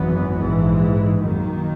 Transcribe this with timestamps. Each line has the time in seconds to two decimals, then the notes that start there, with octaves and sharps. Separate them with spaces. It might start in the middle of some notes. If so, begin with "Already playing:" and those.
Already playing: G#1 F#2 E3 B3
0.39 A#1 G#2 E3
1.20 F#2 D#3 A#3